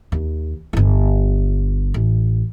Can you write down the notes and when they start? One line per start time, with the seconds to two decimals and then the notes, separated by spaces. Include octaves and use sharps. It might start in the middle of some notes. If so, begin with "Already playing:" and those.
0.12 D#2
0.73 G1 F4
1.94 A1